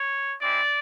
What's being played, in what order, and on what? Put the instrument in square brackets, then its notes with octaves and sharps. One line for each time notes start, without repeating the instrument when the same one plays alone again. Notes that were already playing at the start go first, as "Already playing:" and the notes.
Already playing: [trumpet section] C#5
G#3 C4 E4 D5